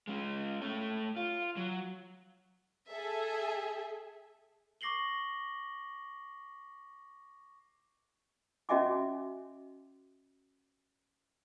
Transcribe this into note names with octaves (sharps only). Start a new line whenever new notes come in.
G#3 C#4
A3 C#5
F4
F#3
G#4 A4 E5
C#6 D6 A#6 C7 F#7 G7
C#4 F#4 D#5 E5 G#5 D6